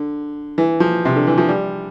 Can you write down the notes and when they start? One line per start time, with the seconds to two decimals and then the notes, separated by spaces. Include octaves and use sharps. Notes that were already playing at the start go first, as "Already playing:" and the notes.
Already playing: D3
0.58 E3
0.80 F3
1.05 C3
1.16 D3
1.27 E3
1.38 F3
1.49 G3